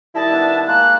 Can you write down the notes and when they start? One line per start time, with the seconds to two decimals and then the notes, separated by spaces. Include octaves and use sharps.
0.15 D#3 G3 E4 D#5 A5
0.31 B3 D4
0.67 G#3 A#3 F#6